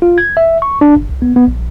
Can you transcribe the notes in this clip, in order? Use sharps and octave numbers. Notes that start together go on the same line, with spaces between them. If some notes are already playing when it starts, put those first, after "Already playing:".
F4
G#6
E5
C#6
D4
G1
C2
B3
B3
A#1